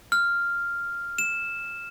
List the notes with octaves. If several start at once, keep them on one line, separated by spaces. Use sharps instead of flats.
F6
E7